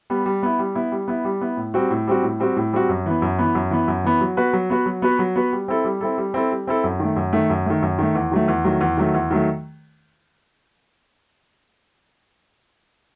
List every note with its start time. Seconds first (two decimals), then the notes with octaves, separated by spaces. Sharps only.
0.10 G3 B3
0.26 G3
0.43 B3 E4
0.59 G3
0.75 B3 E4
0.92 G3
1.08 B3 E4
1.25 G3
1.41 B3 E4
1.57 A2
1.74 G3 C4 F#4
1.91 A2
2.07 G3 C4 F#4
2.23 A2
2.40 G3 C4 F#4
2.56 A2
2.73 G3 C4 F#4
2.89 F#2
3.06 E3 B3
3.22 F#2
3.39 E3 B3
3.55 F#2
3.71 E3 B3
3.88 F#2
4.04 E3 B3
4.21 F#3
4.37 B3 F#4 B4
4.53 F#3
4.70 B3 F#4 B4
4.86 F#3
5.02 B3 F#4 B4
5.19 F#3
5.36 B3 F#4 B4
5.53 G3
5.68 C4 E4 A4
5.85 G3
6.01 C4 E4 A4
6.18 G3
6.34 C4 E4 A4
6.51 G3
6.67 C4 E4 A4
6.84 F#2
7.00 D#3 A3
7.16 F#2
7.33 D#3 A3
7.50 F#2
7.66 D#3 A3
7.82 F#2
7.98 D#3 A3
8.15 E2
8.31 D#3 F#3 A3
8.48 E2
8.64 D#3 F#3 A3
8.81 E2
8.97 D#3 F#3 A3
9.14 E2
9.31 D#3 F#3 A3